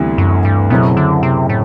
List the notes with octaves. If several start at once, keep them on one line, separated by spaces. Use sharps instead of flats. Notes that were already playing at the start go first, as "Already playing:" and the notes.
Already playing: D2 C3 E3 G3 B3
F#2
G2
F#1 F#2 B2 F#3 C4 E4
D3
C3
A2